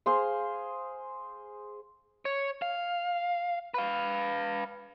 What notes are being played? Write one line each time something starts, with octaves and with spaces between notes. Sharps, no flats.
G#4 C5 F5
C#5
F5
B4 F5